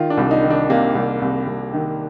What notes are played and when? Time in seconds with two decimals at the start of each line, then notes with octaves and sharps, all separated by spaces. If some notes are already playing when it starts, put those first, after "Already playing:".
Already playing: D#3 F4
0.10 D4
0.17 C2
0.31 D#4
0.43 D#3
0.50 D4
0.70 C3 A#3
0.95 C2
1.22 C2
1.47 C2
1.74 D#3